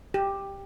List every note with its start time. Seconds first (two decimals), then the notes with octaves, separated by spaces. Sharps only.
0.14 G4